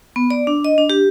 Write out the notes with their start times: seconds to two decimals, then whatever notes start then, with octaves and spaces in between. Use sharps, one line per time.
0.16 B3
0.30 D5
0.47 D4
0.65 D#5
0.78 D4
0.90 G4